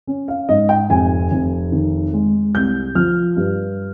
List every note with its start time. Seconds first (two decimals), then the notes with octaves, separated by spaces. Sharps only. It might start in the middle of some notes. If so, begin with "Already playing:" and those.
0.07 C#4
0.28 F5
0.49 G#2 D#5
0.69 G5
0.90 F1 G#5
1.31 F1
1.72 D#3
2.13 G#3
2.54 C2 G6
2.95 F3 F6
3.37 G2